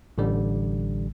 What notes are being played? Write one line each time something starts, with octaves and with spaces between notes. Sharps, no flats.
A1 D3 G3